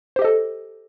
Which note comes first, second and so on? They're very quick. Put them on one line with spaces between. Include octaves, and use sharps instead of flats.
C5 G4 D#5 A4